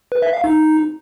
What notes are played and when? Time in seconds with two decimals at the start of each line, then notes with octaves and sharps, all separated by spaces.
0.12 B4
0.22 E5
0.33 F5
0.44 D#4